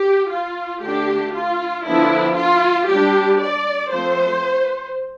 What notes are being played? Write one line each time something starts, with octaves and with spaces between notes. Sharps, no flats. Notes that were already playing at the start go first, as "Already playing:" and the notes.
Already playing: G4
F4
D3 A3 D4 G4
F4
D3 F3 B3 D4 E4
F4
G3 D4 G4
D5
F3 A3 C4 C5